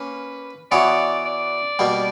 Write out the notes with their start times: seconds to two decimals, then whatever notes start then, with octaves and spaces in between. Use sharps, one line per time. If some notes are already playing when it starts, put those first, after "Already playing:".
Already playing: A#3 C#4 B4
0.71 E3 B3 F#4 C#5 D5
1.26 D5
1.79 B2 G3 A#3